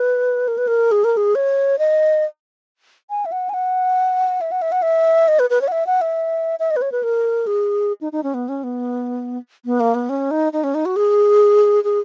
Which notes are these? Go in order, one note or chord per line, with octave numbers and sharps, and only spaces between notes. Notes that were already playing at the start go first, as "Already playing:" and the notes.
Already playing: B4
A#4
B4
A#4
G#4
A#4
G#4
C#5
D#5
G#5
E5
F#5
G#5
F#5
E5
F#5
E5
F#5
E5
D#5
B4
B4
C#5
F#5
E5
F#5
E5
E5
D#5
B4
C#5
B4
A#4
G#4
D#4
D#4
C#4
B3
C#4
B3
B3
A#3
B3
C#4
D#4
D#4
C#4
D#4
F#4
G#4
G#4